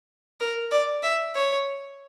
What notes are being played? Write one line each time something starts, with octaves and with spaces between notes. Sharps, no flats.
A#4
D5
E5
C#5